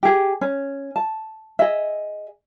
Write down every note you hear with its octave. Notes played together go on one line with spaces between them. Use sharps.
G4 G#4
C#4
A5
G#4 D#5 E5